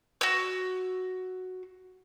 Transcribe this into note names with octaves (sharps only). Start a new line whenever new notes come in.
F#4 E6